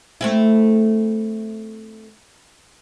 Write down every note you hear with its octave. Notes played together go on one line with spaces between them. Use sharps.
A3 C4 E4